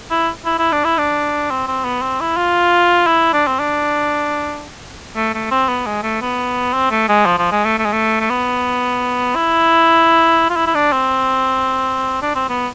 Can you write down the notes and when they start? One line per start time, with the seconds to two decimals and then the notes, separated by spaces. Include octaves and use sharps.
0.11 E4
0.45 E4
0.59 E4
0.72 D4
0.84 E4
0.98 D4
1.50 C4
1.67 C4
1.85 B3
2.02 C4
2.20 E4
2.37 F4
3.07 E4
3.33 D4
3.47 C4
3.59 D4
5.16 A3
5.34 A3
5.51 C4
5.69 B3
5.86 G#3
6.03 A3
6.21 B3
6.73 C4
6.91 A3
7.08 G#3
7.26 F3
7.38 F3
7.52 G#3
7.65 A3
7.79 A3
7.85 G#3
7.92 A3
8.21 A3
8.30 B3
9.35 E4
10.50 F4
10.57 E4
10.67 E4
10.75 D4
10.92 C4
12.22 D4
12.35 C4
12.49 B3